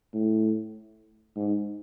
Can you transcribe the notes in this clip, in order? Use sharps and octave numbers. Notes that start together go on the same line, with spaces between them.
A2
G#2